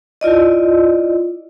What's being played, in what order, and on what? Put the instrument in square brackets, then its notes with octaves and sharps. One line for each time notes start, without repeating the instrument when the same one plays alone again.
[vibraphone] E4 F4 D5 D#5